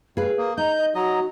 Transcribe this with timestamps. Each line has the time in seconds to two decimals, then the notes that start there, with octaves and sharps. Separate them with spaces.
0.17 G2 G#4 B4 F5
0.38 A#3 D#6
0.58 D#4 A#5 G6
0.78 D#5
0.95 F#3 F#4 D#5 A#5